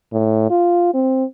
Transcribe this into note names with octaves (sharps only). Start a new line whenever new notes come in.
A2
F4
C4